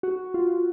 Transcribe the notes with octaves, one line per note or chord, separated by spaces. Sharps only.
F#4
F4